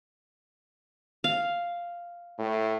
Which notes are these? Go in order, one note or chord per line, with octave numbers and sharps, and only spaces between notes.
F5
A2